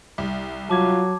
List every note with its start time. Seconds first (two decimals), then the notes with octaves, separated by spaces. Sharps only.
0.18 C2
0.70 F#3 F4 A5 D6 G#6